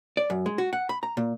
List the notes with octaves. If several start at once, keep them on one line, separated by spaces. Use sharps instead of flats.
D5
F#2
G#3
F#4
F#5
B5
A#5
A#2